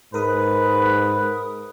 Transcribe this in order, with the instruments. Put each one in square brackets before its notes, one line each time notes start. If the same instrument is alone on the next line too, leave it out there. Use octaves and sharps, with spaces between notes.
[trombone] G#2 [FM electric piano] A#4 D#6 [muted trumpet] B4